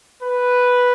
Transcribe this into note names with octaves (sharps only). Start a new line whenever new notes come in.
B4